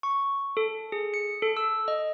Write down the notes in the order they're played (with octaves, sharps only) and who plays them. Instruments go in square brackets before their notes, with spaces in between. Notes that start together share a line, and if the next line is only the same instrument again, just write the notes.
[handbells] C#6
A4
G#4
C#7
A4
E6
D#5